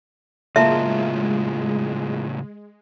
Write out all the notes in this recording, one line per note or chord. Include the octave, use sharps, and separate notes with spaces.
A2 C#3 F#3 G#3 A#3 F4 E5 A5